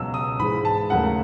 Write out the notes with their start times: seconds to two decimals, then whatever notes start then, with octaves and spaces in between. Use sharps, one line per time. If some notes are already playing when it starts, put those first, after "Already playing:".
Already playing: C#2 B2 F#3 E6
0.14 D#6
0.39 G#2 E3 G#3 B5
0.65 A5
0.90 D#2 C#3 F#3 A3 F#5